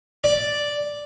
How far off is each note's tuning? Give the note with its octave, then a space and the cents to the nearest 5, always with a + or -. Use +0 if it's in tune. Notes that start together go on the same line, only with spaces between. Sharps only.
D5 +0